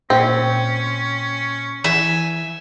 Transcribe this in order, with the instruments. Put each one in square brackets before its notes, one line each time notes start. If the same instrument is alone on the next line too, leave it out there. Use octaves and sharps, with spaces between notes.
[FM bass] A#2 [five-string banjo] C4 [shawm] C#4
[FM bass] E3 [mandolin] E5 [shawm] G#5